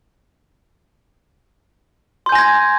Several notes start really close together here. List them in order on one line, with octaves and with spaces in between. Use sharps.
C6 G6 G#5 A#6 G#6